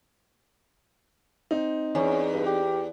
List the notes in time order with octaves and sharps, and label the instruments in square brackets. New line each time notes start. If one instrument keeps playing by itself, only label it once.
[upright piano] C4 D#4
[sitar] E2 [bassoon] C#4
[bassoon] G2
G4